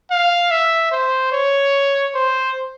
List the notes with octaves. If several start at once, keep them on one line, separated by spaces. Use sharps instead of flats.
F5
E5
C5
C#5
C5